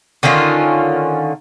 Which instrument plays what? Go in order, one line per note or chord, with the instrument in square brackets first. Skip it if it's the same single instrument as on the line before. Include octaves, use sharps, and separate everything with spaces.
[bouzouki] D3 D#3 C#4 F4